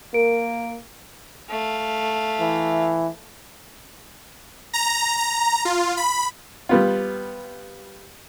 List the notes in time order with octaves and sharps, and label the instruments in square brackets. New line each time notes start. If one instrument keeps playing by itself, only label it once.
[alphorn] A#3 [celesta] A#4 D7
[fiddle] A3 F5
[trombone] E3
[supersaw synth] A#5
A#5
F4
B5
[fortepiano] G3 B3 F4